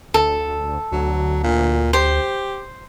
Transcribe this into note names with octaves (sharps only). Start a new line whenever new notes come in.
D2 A4
D2 F#3
A#2
G4 C5